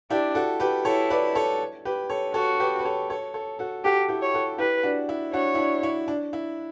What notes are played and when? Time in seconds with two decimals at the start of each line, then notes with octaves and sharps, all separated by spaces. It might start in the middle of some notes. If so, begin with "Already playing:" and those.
0.10 D4 E4 G4
0.35 F#4 A4
0.60 G4 B4
0.85 E4 A4 C#5
1.10 B4 D5
1.35 A4 C#5
1.85 G4 B4
2.10 A4 C#5
2.34 F#4 A4 C#5
2.60 G4 B4
2.79 B4
2.85 A4 C#5
3.10 A4 C#5
3.34 A4 C#5
3.59 F#4 A4
3.84 F#4 G4 A4
4.08 E4 G4
4.22 C#5
4.34 F#4 A4
4.58 E4 G4 B4
4.83 D4 F#4
5.09 E4
5.33 D4 F#4 C#5
5.55 E4
5.58 D4
5.83 E4
6.08 D4
6.33 E4